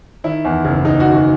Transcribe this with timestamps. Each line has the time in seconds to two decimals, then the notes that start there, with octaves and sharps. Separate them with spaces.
0.24 D#3 E4
0.45 E2
0.65 F#1
0.85 F#1 D#4
1.00 F#4
1.05 D#3
1.15 F#4